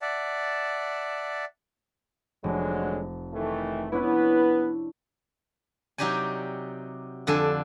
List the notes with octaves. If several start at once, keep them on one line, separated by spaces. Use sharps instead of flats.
D5 E5 F#5 A5
F1 D3 F#3 G#3
D#3 E3 A3
B3 C#4 D4 E4 B4
C3 F#3 D#4 G4 D5 G#5
F2 D3 D5 G#5 A5